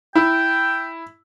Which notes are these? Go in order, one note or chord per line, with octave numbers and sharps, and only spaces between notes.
E4 G5